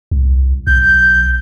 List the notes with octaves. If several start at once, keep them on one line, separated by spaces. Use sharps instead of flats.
C2
B1 G6